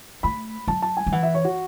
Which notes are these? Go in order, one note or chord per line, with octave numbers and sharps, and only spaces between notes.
A3 B5
F#3 A5
A5
G#5
F#3
E3 F#5
E5
C#5
F#4